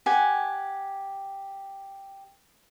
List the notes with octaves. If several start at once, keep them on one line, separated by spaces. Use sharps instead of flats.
G4 F#5 G#5